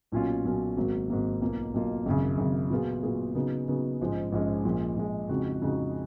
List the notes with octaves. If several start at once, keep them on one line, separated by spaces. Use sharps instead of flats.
B1 A#2 F#3 C#4 F4
B1 A#2 F#3 C#4 F4
G#1 G#2 F#3 A#3
G#1 G#2 F#3 A#3
B1 B2 A#3 F4
B1 B2 A#3 F4
G#1 F#2 C#3
G#1 F#2 C#3
A#2 F#3 B3 F4 G#4
A#2 F#3 B3 F4 G#4
C#3 F#3 B3 D#4
C#3 F#3 B3 D#4
A#1 G#2 F3 G#3 C#4
A#1 G#2 F3 G#3 C#4
A#1 A#2 G#3
A#1 A#2 G#3
F2 C#3 G#3 D#4 F#4
F2 C#3 G#3 D#4 F#4